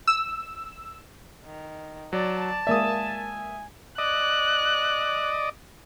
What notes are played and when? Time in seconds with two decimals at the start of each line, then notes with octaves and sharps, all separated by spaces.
0.08 E6
1.45 D#3
2.13 F#3 D5 A5
2.67 G#3 A#3 D5 E5 G#5 D#6
3.98 D5 D#5 F#6